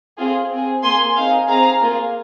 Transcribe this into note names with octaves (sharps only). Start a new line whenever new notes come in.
C4 F4 G#4
C4 G#4
A#3 G#4 G#5 C6
C4 D#4 G#4 F5
C4 G#4 F5 A#5
A#3 F4 G#4